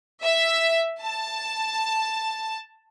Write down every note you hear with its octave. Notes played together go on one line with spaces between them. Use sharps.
E5
A5